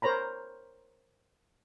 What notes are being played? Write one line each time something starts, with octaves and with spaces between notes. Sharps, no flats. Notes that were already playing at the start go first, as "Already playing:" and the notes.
A#4 C5 C#5 A#5 B5